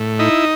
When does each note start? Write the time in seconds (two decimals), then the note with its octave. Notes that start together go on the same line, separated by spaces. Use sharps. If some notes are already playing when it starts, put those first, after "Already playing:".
Already playing: A2
0.19 D#4 E4